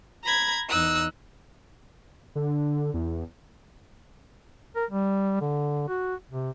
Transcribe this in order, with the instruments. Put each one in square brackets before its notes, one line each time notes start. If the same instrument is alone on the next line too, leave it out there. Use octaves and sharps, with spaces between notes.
[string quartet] A#5 B5 G#6
E2 D#4 E6 F#6
[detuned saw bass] D3
E2
[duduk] A#4
G3
D3
F#4
C3